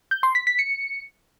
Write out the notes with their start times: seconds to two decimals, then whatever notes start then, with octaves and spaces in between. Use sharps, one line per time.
0.11 G6
0.23 C6
0.35 B6
0.47 B6
0.59 C#7